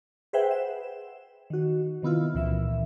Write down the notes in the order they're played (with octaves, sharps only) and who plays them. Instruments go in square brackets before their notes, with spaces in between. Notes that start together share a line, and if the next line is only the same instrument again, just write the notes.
[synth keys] G#4 B4 C5 E5 F#5 G5
E7
D#3 F#4
C3 D#3 B3 E4 F4
C#2 A#2 E3 E5